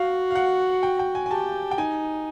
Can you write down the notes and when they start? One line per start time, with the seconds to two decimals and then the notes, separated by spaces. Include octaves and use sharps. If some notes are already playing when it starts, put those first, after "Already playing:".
Already playing: F#4 F5
0.31 F5
0.35 F#5
0.83 G5
0.99 G5
1.15 G#5
1.26 G#5
1.31 G4 A5
1.71 G5
1.78 D#4 G#5